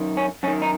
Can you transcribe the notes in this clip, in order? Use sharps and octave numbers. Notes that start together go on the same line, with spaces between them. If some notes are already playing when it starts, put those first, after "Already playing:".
Already playing: F#2 D#3
C#4
F#2 D#3 C#4
D#4